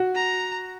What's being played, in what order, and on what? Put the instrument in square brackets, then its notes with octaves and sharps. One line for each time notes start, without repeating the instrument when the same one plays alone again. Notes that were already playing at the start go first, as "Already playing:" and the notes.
Already playing: [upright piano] F#4
[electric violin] A#5